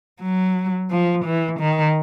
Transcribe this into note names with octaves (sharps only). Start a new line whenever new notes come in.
F#3
F3
E3
D#3